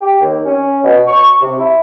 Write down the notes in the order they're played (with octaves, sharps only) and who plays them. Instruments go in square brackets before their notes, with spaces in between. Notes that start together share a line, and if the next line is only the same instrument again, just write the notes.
[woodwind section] G4
D#2
C#4
B2
C#6
C3
E4